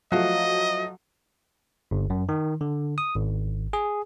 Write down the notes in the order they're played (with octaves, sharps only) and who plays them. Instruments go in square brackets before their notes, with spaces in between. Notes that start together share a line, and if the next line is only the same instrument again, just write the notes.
[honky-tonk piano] F3 F#3 A3 [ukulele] F#4 F5 [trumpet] D#5
[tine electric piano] G1
F#2
D#3
D3
D#6
G#1
G#4